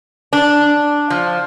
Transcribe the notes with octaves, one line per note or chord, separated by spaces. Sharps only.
D4
F3